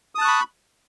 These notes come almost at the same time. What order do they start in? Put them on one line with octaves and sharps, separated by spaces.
D#6 A5 F#6 C#6 B5